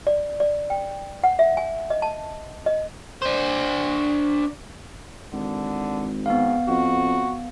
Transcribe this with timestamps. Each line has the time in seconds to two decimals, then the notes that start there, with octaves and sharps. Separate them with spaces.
0.07 D5
0.40 D5
0.70 G5
1.24 F#5
1.39 E5
1.57 G#5
1.90 D#5
2.02 A5
2.66 D#5
3.22 D4 C5
5.33 G#1 D3
6.26 G#2 B3 F5
6.68 F2 F#4